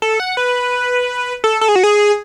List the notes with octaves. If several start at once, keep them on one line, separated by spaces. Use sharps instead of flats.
A4
F#5
B4
A4
A4
G#4
F#4
G#4